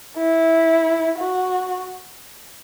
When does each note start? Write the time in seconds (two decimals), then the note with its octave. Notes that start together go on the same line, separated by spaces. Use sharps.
0.17 E4
1.19 F#4